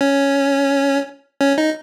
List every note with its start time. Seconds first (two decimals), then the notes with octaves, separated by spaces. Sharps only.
0.01 C#4
1.41 C#4
1.58 D#4